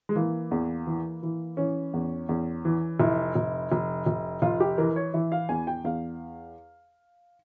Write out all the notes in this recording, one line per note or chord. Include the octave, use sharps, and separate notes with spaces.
G#3
E3 A#3
E2
E3
E3
E3 C#4
E2
E2
E3
F1 E4
F1
F1
F1
F1 F4
G4
E3 A#4
C#5
E3 E5
F5
E2 G#5
G5
E2 F5